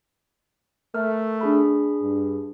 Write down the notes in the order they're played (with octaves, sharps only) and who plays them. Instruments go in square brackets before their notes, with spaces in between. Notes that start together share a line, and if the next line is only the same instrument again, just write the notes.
[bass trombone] A3 [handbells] A#4 E5 F6
[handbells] D4 G#4 B5
[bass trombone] G2